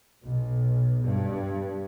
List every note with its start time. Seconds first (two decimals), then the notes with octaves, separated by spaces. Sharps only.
0.23 B1
1.02 G2